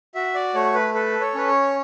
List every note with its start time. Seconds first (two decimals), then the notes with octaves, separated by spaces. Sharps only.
0.15 F#4 E5
0.35 D5
0.54 A3 C#5
0.75 B4
0.94 A4 B4
1.21 C#5
1.35 C#4 B4
1.48 C#5